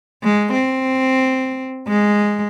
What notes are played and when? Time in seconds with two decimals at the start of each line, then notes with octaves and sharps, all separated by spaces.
0.24 G#3
0.53 C4
1.88 G#3